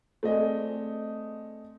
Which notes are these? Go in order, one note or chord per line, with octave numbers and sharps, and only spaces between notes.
A3 C4 G#4 D5 D#5